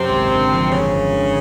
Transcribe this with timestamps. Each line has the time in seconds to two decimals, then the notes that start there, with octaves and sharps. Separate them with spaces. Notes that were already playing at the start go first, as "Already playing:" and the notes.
Already playing: F#2 C3 C4
0.09 G#1
0.30 D3
0.51 F3
0.71 F#2 C#3 C#4
0.92 G#1
1.13 D3